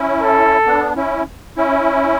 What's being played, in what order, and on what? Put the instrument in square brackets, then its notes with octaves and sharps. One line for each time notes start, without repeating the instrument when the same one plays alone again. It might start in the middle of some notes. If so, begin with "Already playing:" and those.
Already playing: [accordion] C#4 E4
[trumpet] A4
[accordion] B3 D4
C#4 E4
C#4 E4